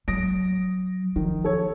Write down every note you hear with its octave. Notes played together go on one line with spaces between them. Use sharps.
F#3 D#6 A#6 D7
D#3 F3
A4 C#5